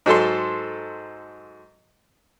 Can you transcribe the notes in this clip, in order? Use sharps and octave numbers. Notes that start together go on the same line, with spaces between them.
G#2 F#3 A4 C6